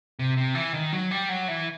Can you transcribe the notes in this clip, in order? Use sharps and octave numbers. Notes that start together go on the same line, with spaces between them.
C3
C3
E3
D#3
F#3
G3
F#3
E3